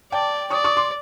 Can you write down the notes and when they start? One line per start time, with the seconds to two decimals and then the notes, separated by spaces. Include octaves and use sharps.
0.12 D5 G5 A5
0.50 D5 C#6 D#6
0.64 C#6 D#6
0.77 C6 D6